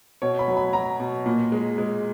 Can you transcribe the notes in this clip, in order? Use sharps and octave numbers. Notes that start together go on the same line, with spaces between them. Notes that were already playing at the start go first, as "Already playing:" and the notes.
B2 C#5
B5
F#3
B5
F#3 A#5
B2
A#2
G#3
G#3